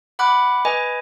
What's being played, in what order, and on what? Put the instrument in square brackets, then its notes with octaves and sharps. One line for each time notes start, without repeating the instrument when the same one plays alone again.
[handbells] F#5 B5 D6 F#6
B4 D#5 G#5